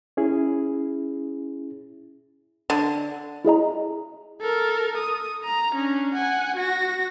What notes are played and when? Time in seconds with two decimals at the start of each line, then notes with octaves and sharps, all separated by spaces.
0.17 C#4 E4 G#4
2.70 D3
3.45 E4 G#4 D#5 A#5
4.41 A4 A#4
4.98 D#6
5.45 A#5
5.75 C#4 D4
6.15 F#5 G#5
6.57 F#4 A#6